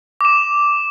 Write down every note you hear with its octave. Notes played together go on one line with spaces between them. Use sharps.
D6 E7